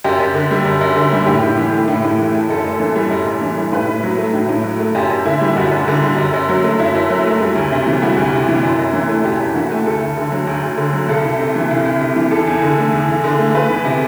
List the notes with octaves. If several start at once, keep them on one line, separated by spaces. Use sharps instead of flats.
F#2 G4
F#2
D3
G3
F#2
F#2
D3
G3
A2 G4
A2
E3
A3
A2
A2
E3
A3
F#2 A4
F#2
E3
G3
F#2
F#2
E3
G3
A2 B4
A2
F#3
A3
A2
A2
F#3
A3
F#2 G4
F#2
D3 E4
G3
F#2 F#4
F#2
D3
G3
F#2
F#2
F#3
A3
F#2 E4
F#2
F#3
A3
G3
D2
C3
E3
G3 F#4
D2
C3
E3
F#2
F#2
E3
A3
F#2 G4
F#2
E3 F#4
A3
D2 A4
D2
D3
F#3
D2
D2
D3
F#3
C2 A4
C2
C3
E3
C2
C2
C3
E3
E2 A4
E2
D3
A3
E2
E2
D3
A3
A3 B4
E2
C3